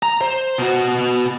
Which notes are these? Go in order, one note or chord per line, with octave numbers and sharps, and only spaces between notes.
A#5
C5
B2 F#4